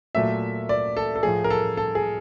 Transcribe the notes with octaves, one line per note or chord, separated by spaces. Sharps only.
A#2 F#3 A3 E5
D5
A4
A4
A2 F3 A3 G#4
A#4
A4
A4
G#4